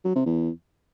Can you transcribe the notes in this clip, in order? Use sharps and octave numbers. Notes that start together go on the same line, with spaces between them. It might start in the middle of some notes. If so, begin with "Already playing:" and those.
F#3
C3
E2